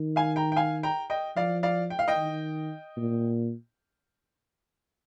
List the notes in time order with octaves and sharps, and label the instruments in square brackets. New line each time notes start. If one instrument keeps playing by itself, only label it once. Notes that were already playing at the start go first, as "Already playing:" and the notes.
Already playing: [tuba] D#3
[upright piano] F5 G#5
G5 A#5
G5
F5 G#5
G5 A#5
D#5 G5
[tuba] F3 [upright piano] D5 F5
[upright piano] D5 F5
G5
F5
D#5 G5
[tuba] D#3
A#2